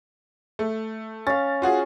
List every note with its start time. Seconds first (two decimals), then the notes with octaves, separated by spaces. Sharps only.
0.59 A3
1.27 C#4 F5 A6
1.62 F4 F#4 G#4